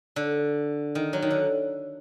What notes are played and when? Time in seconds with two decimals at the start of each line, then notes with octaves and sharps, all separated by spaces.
0.16 D3
0.95 D#3
1.13 F#3
1.22 D#3
1.31 D3